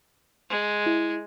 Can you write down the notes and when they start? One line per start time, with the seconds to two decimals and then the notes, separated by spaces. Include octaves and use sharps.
0.49 G#3
0.86 E4